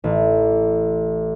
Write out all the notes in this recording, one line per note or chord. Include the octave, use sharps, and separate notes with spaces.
A1